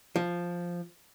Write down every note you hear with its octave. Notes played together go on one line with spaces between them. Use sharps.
F3